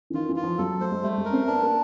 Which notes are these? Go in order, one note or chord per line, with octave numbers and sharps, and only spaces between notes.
E3
D#3 F4
E3
F4
F3
F#3 A4
A3 C5
G#3
G3 A3
G#3
C#4 A#4
C4
B3 D4
A#3